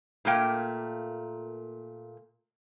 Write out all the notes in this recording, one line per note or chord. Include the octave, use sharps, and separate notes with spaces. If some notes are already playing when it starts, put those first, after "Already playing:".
A#2 A3 A#3 G5